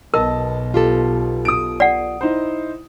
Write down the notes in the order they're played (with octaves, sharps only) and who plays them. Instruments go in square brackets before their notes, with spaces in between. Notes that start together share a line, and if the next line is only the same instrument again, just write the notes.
[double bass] B1 B2 [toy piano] A#4 [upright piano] D#5 A5
[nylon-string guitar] F4 G4 A4
[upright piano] D#6 D7
[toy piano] D5 F#5
[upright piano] D#4 E4 C5